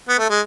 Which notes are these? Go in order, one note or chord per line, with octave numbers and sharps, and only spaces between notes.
B3
A3
G#3